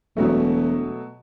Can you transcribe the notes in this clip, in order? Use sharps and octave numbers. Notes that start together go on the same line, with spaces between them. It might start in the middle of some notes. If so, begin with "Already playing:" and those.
E1 B2 F#3 A3